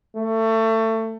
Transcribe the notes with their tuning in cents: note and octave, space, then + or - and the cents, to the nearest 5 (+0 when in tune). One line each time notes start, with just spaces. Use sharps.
A3 +25